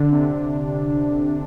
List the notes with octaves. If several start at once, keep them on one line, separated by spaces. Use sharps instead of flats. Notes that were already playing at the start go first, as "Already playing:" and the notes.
Already playing: D3 D4
C3
D3